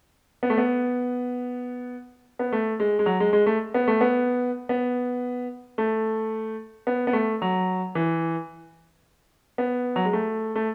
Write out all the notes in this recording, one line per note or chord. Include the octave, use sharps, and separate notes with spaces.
B3
A3
B3
B3
A3
G#3
G#3
F#3
G#3
G#3
A3
B3
A3
B3
B3
A3
B3
B3
A3
F#3
E3
B3
F#3
G#3
A3
A3